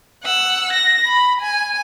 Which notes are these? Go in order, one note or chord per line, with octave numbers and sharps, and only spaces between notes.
F#5 E6
A#6
B5
G#5